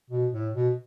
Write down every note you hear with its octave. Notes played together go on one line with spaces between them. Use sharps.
B2
A2
B2